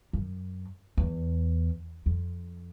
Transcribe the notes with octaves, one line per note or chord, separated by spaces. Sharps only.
F#2
E2
F2